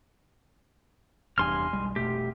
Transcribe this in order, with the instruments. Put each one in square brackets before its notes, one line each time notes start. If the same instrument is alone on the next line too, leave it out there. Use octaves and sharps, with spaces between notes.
[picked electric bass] F1 E2 G2 [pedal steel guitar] G#5 C6 F6
[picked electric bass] B1 G3 G#3
[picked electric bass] F1 B2 A3 [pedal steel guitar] G4